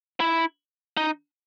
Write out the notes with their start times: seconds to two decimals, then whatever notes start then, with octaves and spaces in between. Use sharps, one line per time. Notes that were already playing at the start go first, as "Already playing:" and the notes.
0.20 E4
0.97 D#4